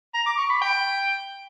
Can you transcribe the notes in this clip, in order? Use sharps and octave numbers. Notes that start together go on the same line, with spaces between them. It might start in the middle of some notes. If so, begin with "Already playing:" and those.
A#5
D6
C#6
B5
G5